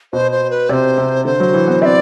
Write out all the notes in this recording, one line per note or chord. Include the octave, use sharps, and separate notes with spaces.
B2 C5
C5
B4
C3 C5 D5
C3
D3 C5
F#3
E3
B3
C4 D5 E5